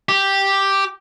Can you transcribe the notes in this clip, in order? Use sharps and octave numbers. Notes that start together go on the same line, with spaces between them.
G4